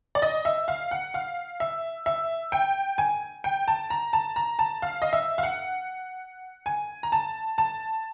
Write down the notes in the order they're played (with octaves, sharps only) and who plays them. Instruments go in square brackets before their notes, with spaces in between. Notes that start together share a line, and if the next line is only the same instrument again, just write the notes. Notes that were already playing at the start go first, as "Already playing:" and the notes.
[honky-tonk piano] D5
D#5
E5
F5
F#5
F5
E5
E5
G5
G#5
G5
A5
A#5
A5
A#5
A5
F5
D#5
E5
F5
F#5
G#5
A#5
A5
A5